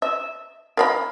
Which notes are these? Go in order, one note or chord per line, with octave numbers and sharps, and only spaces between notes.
E5
A#4 F5 B5